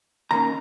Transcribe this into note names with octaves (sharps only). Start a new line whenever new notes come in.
D#2 D#3 A#3 C#4 A#5